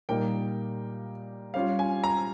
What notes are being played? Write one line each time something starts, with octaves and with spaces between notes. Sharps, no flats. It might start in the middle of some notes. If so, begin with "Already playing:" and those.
A#2 G3 A#3 D#4 G5
G3 C#4 F4 F5
G#5
A#5